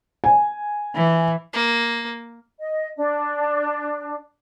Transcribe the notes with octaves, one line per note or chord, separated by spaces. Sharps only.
G#5
E3
A#3
D#5
D4